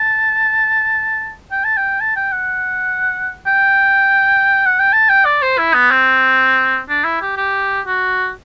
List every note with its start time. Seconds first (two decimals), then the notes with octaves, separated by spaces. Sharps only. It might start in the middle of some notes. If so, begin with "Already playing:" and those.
Already playing: A5
1.52 G5
1.65 A5
1.77 G5
2.01 A5
2.16 G5
2.32 F#5
3.47 G5
4.66 F#5
4.80 G5
4.93 A5
5.09 G5
5.25 D5
5.42 C5
5.58 E4
5.74 B3
5.91 C4
6.89 D4
7.05 E4
7.22 G4
7.37 G4
7.86 F#4